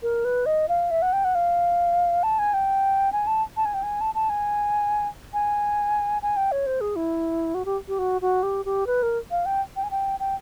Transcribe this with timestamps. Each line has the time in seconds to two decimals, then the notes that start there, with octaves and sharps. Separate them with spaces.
0.03 A#4
0.25 B4
0.46 D#5
0.69 F5
0.91 E5
1.02 F#5
1.13 G5
1.24 F#5
1.35 F5
2.23 A5
2.39 G#5
2.54 G5
3.12 G#5
3.27 A5
3.57 A5
3.65 G#5
3.74 G5
3.83 G#5
4.01 A5
4.15 A5
4.30 G#5
5.33 G#5
6.22 G#5
6.37 G5
6.52 C#5
6.67 C5
6.81 G#4
6.96 E4
7.54 F#4
7.65 G4
7.88 G4
7.99 F#4
8.22 F#4
8.43 G4
8.65 G4
8.87 B4
9.03 A#4
9.31 F5
9.46 G5
9.76 G5
9.83 G#5
9.91 G5
10.20 G5